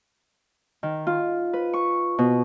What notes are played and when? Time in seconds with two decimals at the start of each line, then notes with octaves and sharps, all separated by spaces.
0.83 D#3
1.07 F4
1.53 B4
1.73 C#6
2.19 B2